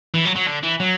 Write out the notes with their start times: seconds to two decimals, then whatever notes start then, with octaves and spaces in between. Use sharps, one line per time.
0.14 E3
0.25 F#3
0.36 F#3
0.47 D3
0.63 E3
0.80 F#3